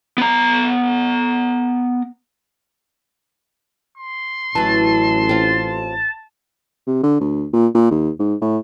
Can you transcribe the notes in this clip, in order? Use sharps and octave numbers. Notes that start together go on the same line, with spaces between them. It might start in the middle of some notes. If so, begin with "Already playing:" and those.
B3 A#5
C6
A1 E3 F#3 A5
C4 F4
C3
D3
D2
A#2
A#2
D#2
G#2
A2